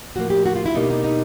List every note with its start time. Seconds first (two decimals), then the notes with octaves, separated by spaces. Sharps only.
0.16 A2 F3 A#3 F#4
0.30 G4
0.46 F#4
0.56 F4
0.66 E4
0.75 B2 G3 A#3 D#4
0.90 D#4
1.04 D#4